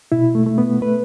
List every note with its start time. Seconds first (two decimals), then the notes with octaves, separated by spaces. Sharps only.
0.12 B2 E4
0.35 A3
0.46 A3
0.58 B3
0.81 A3 B4